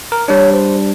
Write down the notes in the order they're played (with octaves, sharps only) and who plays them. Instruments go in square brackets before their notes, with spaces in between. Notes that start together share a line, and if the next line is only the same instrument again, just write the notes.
[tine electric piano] A#4
[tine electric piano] G3 D4 [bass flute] C#5
[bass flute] C5